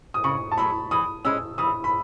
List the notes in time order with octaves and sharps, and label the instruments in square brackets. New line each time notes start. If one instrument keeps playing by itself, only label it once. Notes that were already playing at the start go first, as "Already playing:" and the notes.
[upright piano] D#6
[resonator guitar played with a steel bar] C#3 [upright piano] C#6
[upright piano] A5
[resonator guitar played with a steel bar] F#3 A3 [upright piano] B5
[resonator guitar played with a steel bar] E3 [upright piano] D#6
[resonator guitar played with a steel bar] G#3 C#4 [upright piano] E6
[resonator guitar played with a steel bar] E3 [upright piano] D#6
[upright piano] B5